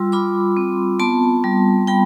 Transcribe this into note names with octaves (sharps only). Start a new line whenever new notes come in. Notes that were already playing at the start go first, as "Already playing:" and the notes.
Already playing: G3 F4 C6 E6
F4 B5 D6
C4
B3 A5 C6
G3
G3 G5 B5